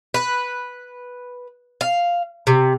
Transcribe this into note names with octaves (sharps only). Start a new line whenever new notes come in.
B4
F5
C3